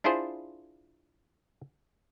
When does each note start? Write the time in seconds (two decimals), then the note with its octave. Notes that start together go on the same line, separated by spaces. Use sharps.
0.04 D4 E4 F4 G#4 C5